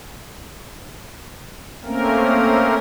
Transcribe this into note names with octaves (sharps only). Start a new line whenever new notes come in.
A3 A#3 C4 C#4 A#4